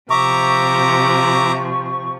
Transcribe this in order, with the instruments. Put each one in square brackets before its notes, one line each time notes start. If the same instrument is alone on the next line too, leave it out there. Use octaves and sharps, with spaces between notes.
[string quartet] C3 F3 [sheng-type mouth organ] E5 A#5 D6 [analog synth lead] C#6